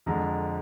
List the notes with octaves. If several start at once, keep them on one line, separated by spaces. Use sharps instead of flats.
F2 D3 G#3 A#5